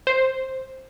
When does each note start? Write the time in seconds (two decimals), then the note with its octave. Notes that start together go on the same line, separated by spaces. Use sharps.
0.07 C5